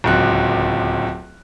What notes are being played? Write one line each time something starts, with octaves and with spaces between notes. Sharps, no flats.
D1 C#2 F#6